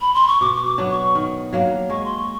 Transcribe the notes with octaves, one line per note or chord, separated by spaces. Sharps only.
B5
C6
C#6
B2 D6
C#6
D6
F#3 B3 D4
C#6
D#3
F#3 A#3 D4
G#3 C#6
C6
C#6